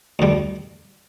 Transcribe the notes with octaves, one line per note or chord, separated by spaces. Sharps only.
D2 D3 G3